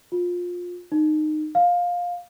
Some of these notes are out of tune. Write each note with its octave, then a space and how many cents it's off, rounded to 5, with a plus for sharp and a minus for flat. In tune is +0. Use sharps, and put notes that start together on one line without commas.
F4 +20
D#4 -20
F5 +15